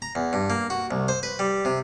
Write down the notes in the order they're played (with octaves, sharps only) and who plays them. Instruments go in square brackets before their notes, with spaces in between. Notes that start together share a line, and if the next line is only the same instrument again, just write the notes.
[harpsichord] A#5
E2
G2
A#3
F#4
C2
C5
B4
G3
C3